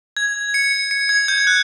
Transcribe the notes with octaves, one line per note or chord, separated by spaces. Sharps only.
G#6
C#7
C#7
G#6
G6
F#6